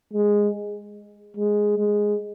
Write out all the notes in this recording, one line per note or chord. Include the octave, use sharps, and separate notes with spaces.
G#3
G#3
G#3